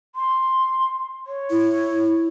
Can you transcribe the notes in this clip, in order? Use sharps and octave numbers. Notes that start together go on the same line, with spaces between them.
C6
C#5
E4